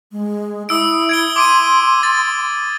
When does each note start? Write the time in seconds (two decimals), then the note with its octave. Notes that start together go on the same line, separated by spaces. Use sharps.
0.12 G#3
0.69 E4 D#6 E6 D7
1.09 G#6 D7 G7
1.36 C6 D6 D7 D#7
2.03 A6